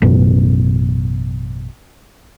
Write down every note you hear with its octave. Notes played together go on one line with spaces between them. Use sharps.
A1 F#2 B2